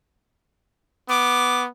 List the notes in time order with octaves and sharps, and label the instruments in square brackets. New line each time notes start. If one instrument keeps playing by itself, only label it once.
[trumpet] B3 [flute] D6